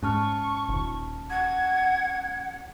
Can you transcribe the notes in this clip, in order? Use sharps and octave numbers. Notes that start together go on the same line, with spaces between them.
G#2 C#4 A5 C#6 F6
D#1 G#1
F#5 G#6